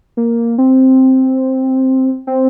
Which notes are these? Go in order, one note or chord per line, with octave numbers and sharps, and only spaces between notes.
A#3
C4
C4